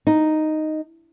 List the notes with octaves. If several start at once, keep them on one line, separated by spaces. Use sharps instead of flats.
D#4